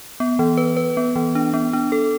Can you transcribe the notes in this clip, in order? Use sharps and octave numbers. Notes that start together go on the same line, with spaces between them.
B3
E3
B4
B4
B3
E3
D4
B3
D4
A4